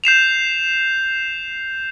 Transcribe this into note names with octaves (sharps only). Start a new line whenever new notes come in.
G6 C7 E7 F7